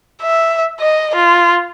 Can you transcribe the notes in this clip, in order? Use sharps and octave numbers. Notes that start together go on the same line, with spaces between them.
E5
D#5
F4